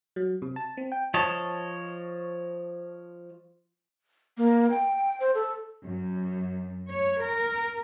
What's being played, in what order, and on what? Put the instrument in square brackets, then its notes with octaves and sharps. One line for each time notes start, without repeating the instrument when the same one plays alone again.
[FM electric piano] F#3
C3
A5
C4
G5
[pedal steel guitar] F3 C#5 D#5 A5
[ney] A#3
G5
C5
A4
[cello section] F#2
C#5
A#4